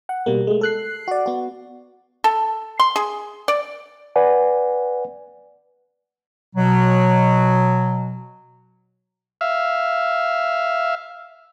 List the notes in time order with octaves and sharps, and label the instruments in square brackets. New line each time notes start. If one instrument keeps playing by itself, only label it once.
[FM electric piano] F#5
B2 G3 A#3
G#3 A3
A4 F#6 C7
F#4 D5
B3 F#4
[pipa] A4
C6
G#4
D5
[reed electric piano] B4 D5 F#5 G#5
[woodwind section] B2 F#3
[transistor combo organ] E5 F5